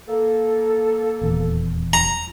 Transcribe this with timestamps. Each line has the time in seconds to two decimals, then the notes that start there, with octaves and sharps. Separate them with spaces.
0.08 A#3 A4
1.21 D#1 E2
1.93 A#5